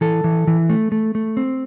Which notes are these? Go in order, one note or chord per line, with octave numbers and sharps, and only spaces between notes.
E3 A4
E3
E3
A3
A3
A3
C4